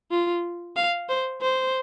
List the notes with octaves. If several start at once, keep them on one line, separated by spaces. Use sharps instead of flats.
F4
F5
C5
C5